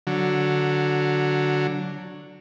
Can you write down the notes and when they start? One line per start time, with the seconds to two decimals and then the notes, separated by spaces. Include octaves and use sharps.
0.07 D3 F#3